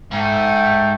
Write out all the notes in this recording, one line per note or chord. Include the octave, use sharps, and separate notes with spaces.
G#2 A3 E5 G5